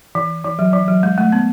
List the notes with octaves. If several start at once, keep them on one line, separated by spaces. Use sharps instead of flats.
E3
E3
F#3
E3
F#3
G#3
A3
B3